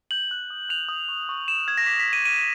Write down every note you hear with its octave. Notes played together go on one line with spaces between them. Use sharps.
G6 F#7
F#6
D#6
F#6 F7
D#6
C#6
C#6
C#6 E7
F6 G#6
A#6
D6 B6
B6
F6
D#7
F6 D#7